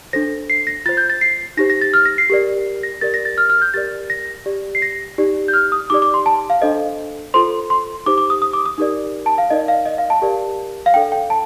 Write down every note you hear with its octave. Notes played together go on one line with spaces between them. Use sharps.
D4 A4 C5 A#6
C7
A#6
F4 C5 A6
G6
A6
C7
D#4 G4 C5 A#6
A#6
A6
F6
A#6
C7
G4 A#4 D5
A#6
G4 A#4 D5 A6
A#6
A6
F6
F6
G6
G4 A#4 D5 A6
A#6
G4 D5
C7
A#6
D#4 G4 D5
G6
F6
D#6
D#4 G4 D5 D6
D6
C6
A5
F5
D4 A4 C5 D#5
F4 A4 C5 C6
C6
D#4 G4 C5 D6
D6
D#6
D#6
D6
D#6
D#4 G4 A#4 D5
A5
F5
D#4 A#4 D5 D#5
F5
D#5
F5
A5
G4 A#4 D5
F5
D4 A4 D5 G5
G5
A5